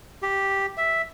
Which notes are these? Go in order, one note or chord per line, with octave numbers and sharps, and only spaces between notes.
G4
E5